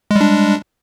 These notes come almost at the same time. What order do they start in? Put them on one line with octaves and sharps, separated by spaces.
G#3 G3 D4